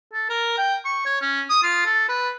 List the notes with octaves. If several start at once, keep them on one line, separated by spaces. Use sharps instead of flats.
A4
A#4
G5
C#6
C#5
C#4
D#6
F4
A4
B4